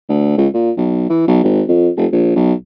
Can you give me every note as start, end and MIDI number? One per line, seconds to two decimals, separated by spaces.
0.09 0.35 38
0.37 0.48 37
0.54 0.71 46
0.77 1.06 35
1.10 1.23 52
1.28 1.40 35
1.44 1.63 32
1.68 1.89 41
1.97 2.06 29
2.12 2.32 34
2.36 2.53 35